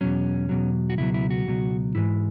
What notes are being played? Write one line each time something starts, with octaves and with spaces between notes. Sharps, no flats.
E2 B2 F#3 C#4
E2 B2 F#3
F#4
C#2 B2 F#3 E4
E4
F#4
C#2 B2 F#3
G#2 E3 G#3 E4